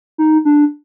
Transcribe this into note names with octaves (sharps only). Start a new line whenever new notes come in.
D#4
D4